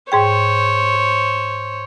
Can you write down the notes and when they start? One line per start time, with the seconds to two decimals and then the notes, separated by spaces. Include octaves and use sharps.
0.12 G#2 G#4 C5 C#5 G5